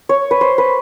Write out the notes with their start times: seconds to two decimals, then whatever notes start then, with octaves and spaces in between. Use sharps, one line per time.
0.09 C#5
0.31 B4
0.41 C5
0.58 B4